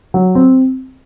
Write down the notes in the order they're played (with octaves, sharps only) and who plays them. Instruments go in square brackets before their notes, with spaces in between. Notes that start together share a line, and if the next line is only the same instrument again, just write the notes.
[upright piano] F#3
C4